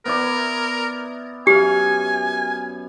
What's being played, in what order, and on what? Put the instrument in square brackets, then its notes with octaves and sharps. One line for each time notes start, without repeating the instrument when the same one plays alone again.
[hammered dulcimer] B3 E4 D5 [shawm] A#4
[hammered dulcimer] F#2 F5 [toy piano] G4 [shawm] G#5